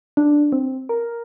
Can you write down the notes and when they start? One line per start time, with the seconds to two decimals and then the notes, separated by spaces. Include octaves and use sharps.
0.17 D4
0.52 C4
0.89 A#4